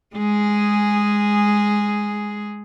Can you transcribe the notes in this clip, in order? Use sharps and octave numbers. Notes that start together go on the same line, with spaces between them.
G#3 G#4